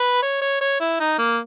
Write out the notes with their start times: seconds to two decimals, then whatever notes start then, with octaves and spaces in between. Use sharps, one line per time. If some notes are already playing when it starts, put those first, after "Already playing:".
Already playing: B4
0.23 C#5
0.41 C#5
0.61 C#5
0.80 E4
1.00 D#4
1.18 A#3